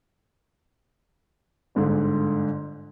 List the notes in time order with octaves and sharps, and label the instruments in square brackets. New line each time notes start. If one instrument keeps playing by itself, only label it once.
[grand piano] G1 G#2 D3